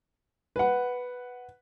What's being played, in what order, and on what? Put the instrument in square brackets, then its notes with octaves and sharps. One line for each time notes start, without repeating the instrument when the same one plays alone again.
[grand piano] B4 F#5